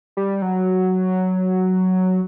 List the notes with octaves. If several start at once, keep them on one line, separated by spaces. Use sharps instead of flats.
G3
F#3